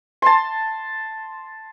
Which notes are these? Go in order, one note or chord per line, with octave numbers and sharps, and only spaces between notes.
A5 C6